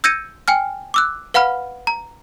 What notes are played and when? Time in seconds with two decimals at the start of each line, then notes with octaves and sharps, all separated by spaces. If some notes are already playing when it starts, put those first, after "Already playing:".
0.04 E6 G6 G#6 A#6 C#7 D#7
0.48 G5 G#5 F6
0.94 D6 E6 F#6
1.34 B4 F5 F#5 B5 F6
1.87 A#5